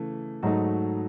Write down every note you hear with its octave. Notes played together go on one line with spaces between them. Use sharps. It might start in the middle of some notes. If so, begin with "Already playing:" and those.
Already playing: C#3 E3 A3
G#2 F#3 A3 D#4 F#4